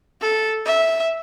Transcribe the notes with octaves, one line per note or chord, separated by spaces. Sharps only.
A4
E5